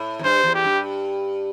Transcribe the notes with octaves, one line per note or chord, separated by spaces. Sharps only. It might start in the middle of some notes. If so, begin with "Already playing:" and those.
Already playing: A2
E2
G2 C5
E2
G4
G2